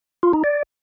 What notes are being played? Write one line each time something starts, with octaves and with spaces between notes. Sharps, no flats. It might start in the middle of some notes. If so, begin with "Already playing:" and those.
F4
D#4
D5